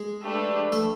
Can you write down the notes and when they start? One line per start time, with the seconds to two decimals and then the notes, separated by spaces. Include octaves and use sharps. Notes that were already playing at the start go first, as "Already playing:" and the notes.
Already playing: G#3 G#4
0.24 A3 D4 G4 B4
0.72 A3 A4